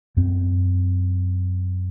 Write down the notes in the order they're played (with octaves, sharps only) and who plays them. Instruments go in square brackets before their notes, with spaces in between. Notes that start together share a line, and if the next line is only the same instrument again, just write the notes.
[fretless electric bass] F#2 C4